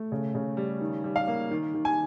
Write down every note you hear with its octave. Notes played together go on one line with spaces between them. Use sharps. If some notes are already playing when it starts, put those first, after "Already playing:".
Already playing: A3
C#3
C#3
G3
D#3
G3
F5
A#3
D#3
D#3
G#5